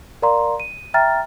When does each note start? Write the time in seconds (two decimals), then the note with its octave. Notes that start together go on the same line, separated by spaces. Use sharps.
0.22 A#4 D5 F5 A#5 C6
0.60 D#7
0.94 E5 G5 A#5 F6 A6